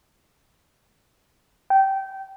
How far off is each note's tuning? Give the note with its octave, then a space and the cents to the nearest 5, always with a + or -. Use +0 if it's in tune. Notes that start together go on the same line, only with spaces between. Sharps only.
G5 -20